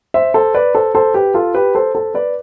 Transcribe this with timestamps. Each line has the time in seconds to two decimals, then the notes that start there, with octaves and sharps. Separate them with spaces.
0.14 C5 E5
0.34 A4 C5
0.54 B4 D5
0.75 A4 C5
0.95 A4 C5
1.14 G4 B4
1.34 F4 A4
1.55 G4 B4
1.75 A4 C5
1.95 A4 C5
2.14 B4 D5